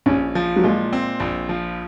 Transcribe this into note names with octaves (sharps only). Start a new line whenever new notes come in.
A#1 C#4
F3
F#3
A#2 G#3
C4
A#1
F3